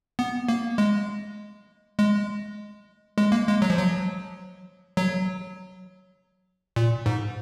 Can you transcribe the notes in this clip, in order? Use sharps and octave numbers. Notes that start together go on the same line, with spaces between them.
B3
A#3
G#3
G#3
G#3
A#3
G#3
F#3
F3
F#3
F#3
A#2
G#2